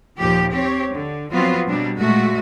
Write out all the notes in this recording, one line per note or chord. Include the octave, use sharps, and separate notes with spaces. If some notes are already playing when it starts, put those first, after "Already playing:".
D#2 A#2 F3 G4
C4 G4 C#5
D3
F3 F#3 B3 C4 F4 F#4
B2 F#3 G3 D4
A#2 G#3 A3 F#4